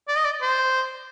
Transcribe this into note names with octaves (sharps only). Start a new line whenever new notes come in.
D5
D#5
D5
C5